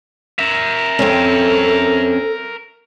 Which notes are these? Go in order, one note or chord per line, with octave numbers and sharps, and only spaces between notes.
A#4 E5
F2 C4 C#4 A4